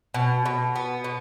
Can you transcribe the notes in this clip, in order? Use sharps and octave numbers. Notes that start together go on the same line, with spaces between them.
B2
B2
B3
B2